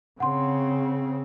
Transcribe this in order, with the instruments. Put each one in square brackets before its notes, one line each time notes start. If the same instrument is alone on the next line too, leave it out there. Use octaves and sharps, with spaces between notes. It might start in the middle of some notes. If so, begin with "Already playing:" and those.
[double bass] C#3 C4 [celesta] F#5 C6